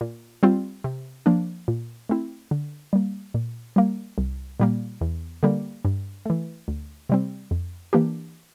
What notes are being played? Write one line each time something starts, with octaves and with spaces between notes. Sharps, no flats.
A#2
G3 C4 F4
C3
F3 A#3 D4
A#2
A3 C4 E4
D3
G3 A#3
A#2
G3 A#3
C2
A#2 G3 A#3
E2
D3 G3 A#3
G2
E3 A3
D2
C3 G3 C4
F2
E3 A#3 D4 G4